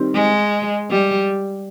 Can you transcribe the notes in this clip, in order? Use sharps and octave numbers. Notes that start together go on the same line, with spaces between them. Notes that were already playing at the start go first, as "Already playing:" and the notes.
Already playing: D#3 G3 C4
G#3
G3